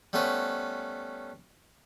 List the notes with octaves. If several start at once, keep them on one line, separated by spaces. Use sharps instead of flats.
G3 A3 B3 C#4 B4 C5